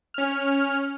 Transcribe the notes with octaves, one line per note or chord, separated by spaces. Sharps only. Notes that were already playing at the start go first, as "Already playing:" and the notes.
C#4 F6